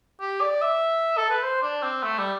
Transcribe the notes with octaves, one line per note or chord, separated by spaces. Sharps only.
G4
D5
E5
A4
B4
C5
D4
C4
A3
G3